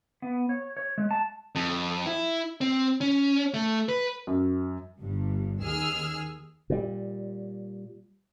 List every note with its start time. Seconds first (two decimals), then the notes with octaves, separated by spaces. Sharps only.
0.22 B3
0.49 C#5
0.77 C#5
0.98 G#3
1.11 A5
1.55 F2
2.06 E4
2.61 C4
3.01 C#4
3.54 A3
3.89 B4
4.27 F#2
5.00 G1 G2
5.61 D#2 G#4 G#5 E6 F6
6.70 A#2 G3